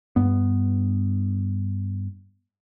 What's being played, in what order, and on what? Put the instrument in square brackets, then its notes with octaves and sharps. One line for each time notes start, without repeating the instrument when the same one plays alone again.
[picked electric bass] G2 B3